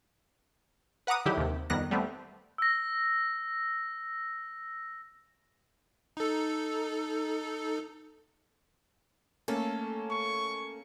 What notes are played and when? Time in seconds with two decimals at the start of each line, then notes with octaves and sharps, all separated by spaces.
1.07 B4 F#5 A#5 D6 D#6
1.26 D3 D#3 F#3 E4 G4
1.37 D#2 C3
1.70 F2 D#3 G3 B3 F#6 A#6
1.91 G3 A3 B3 C4
2.58 E6 A#6
6.17 D#4 A4
9.48 A3 A#3 C#4 A4
10.11 C#6